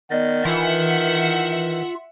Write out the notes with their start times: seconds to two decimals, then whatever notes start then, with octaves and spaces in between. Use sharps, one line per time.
0.11 D#3 B3 D5 D#5
0.45 E3 F4 E5 F#5